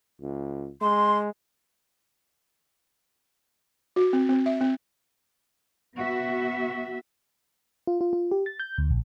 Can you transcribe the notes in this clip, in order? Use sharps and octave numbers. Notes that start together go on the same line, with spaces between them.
C#2
G#3 C6
F#4
C4
C4
E5
C4
B3 F#4 E5
F4
F4
F4
G4
A6
G6
D2
A#1